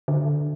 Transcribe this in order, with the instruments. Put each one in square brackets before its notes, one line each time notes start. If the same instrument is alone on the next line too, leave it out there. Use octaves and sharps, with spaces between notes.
[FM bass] D3